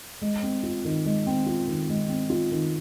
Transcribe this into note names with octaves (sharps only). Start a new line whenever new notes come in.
G#3
C4
F4
D#3
G#3
C4
F4
D#3
G#3
C4
F4
D#3